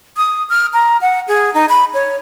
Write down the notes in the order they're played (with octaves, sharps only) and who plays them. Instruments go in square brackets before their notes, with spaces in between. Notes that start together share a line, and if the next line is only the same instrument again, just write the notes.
[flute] D#6
F6
A#5
F#5
G#4
D#4
B5
C#5